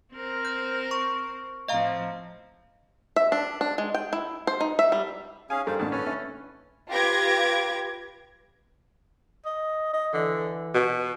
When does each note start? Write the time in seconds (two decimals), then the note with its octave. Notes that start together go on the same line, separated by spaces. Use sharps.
0.14 C4 A#4 C5
0.45 G6
0.91 C#6
1.68 A2 F3 C4 D#5 F5 A#5
3.16 E5
3.32 D4
3.61 D4
3.78 G#3
3.94 G5
4.13 E4
4.47 C5
4.61 D#4
4.79 E5
4.92 G3
5.50 C#4 G#4 F5 G#5
5.67 G2 A4 A#4 C5 F5
5.79 A1 D2 D3 A5
5.92 C#4 A4 B4 F6
6.07 C#4 E5
6.89 F4 G4 B4 G#6 A#6 D7
9.45 D#5
9.93 D#5
10.13 D3 E3
10.74 B2